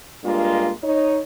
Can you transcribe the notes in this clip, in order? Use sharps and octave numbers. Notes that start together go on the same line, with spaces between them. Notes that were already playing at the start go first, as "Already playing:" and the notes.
G2 G#3 A#3 D4 F4
D#4 C#5